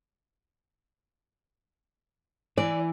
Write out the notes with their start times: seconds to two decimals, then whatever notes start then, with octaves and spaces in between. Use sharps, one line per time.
2.58 E3 D5 G#5